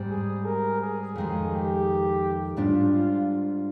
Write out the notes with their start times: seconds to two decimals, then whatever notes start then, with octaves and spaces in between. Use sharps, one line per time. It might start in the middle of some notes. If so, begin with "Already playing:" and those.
Already playing: G#2 G3 C4
0.10 G#4
0.45 A#4
0.81 G#4
1.16 F2 D#3 G#3
1.52 G4
2.57 G#2 G3 D4 F4
2.93 F4